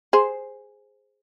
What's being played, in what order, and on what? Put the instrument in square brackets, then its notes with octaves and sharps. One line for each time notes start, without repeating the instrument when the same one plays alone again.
[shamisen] G#4 C5